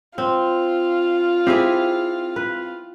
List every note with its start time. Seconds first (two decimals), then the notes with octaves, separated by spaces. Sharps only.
0.18 C4 F4
1.47 C4 E4 G4 G#4
2.36 B4